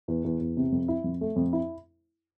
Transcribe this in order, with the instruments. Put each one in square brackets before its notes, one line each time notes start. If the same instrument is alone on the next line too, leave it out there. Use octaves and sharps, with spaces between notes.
[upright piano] E2
E2
E2
C3
F2
E4
F2
A3
F2
E4